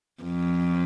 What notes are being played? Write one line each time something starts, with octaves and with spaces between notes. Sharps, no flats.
F2